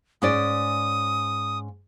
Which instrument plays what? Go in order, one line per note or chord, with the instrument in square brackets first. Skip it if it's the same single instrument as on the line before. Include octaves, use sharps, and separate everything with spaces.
[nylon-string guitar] G#2 C#4 D5 [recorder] D#6